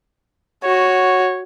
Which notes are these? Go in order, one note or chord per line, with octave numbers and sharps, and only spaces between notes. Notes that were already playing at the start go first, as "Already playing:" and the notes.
F#4 C#5